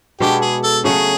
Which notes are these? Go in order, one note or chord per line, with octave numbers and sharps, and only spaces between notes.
B2 G#3 B3 D4 G4
G#4
A4
C#3 F#3 A3 C#4 G#4